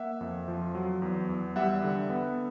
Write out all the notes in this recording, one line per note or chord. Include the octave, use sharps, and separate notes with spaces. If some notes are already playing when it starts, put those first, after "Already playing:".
Already playing: A#3 E5 F#5
F2
F3
F#3
E2
E2
G3 E5 F#5
D3
B3